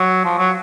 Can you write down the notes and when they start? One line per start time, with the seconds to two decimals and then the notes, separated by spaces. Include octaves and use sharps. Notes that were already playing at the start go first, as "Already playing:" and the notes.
Already playing: F#3
0.25 F3
0.38 F#3